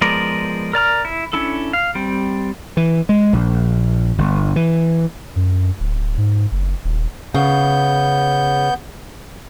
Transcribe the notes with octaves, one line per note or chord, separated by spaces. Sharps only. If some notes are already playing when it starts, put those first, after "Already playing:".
F3 G#3 B3 A#4 D5
A#4 D5 A#5 F6
E4
C#4 D4 E4 A4
F5
G3 C4
E3
G#3
A#1
G1
E3
F#2
D1
G#2
F#1
D#1
C#3 B3 G6